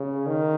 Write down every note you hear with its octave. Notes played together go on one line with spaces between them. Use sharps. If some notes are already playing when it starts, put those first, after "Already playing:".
Already playing: C#3
D#3